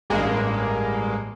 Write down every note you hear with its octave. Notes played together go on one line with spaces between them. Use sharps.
A1 G2 G#3 A#3